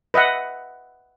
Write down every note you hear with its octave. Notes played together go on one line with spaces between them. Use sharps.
B4 D#5 E5 F#5